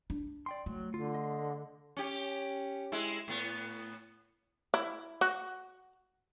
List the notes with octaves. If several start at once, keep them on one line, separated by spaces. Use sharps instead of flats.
D4
D5 G5 C6
F#3 A3
D3 F4
D#5 C6
C#4 G4
G#3 E4
A2 B3
E4
F#4